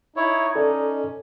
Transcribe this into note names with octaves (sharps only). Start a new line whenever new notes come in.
D#4 E4 C#5
C#4 A4 D5